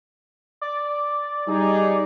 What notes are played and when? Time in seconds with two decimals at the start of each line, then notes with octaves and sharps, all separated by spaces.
0.61 D5
1.48 G3 D#4 G#4